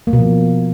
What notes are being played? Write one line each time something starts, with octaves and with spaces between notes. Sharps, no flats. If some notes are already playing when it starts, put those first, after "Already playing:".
A#3
B2
F3